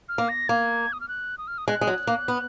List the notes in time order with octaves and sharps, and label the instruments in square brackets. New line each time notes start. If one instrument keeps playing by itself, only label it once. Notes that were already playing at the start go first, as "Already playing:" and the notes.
[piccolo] F6
[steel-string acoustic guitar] A#3
[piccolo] A#6
[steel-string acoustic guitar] A#3 [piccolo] G#6
[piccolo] D#6
F6
F#6
D#6
F6
D#6
[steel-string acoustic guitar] G#3 [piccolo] F#6
[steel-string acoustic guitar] G#3
F#3
A#3
B3